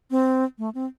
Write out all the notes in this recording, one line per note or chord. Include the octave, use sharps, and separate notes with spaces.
C4
A3
C4